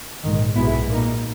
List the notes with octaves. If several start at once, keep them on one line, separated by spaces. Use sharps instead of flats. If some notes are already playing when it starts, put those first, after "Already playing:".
A#1 G#2 D#3
B1 B2 G#3 B3 E4
A#2 A#3 D#4